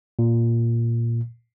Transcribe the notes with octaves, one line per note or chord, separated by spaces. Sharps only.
A#2